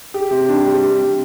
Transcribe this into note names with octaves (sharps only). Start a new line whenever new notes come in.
G4
C3
D4
G3
C3
C3